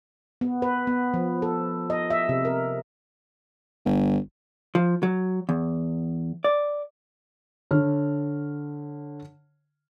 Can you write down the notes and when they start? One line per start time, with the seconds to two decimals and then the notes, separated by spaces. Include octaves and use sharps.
0.41 B3
0.62 B4
0.87 B3
1.14 F3
1.42 A4
1.90 D#5
2.10 E5
2.29 C3
2.45 A#4
3.85 G1
4.75 F3
5.03 F#3
5.49 E2
6.44 D5
7.71 D3 C#5 F6